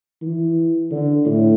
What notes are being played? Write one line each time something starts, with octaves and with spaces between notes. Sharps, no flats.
E3
D3
A2